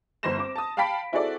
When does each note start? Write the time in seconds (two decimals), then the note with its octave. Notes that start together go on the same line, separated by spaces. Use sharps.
0.23 G1 C5 C6 A#6 E7
0.38 C4 D6
0.56 A5 D#6
0.77 F5 G5 A5 B5 B6 D7
1.12 C4 E4 F#4 G#4 A4 D5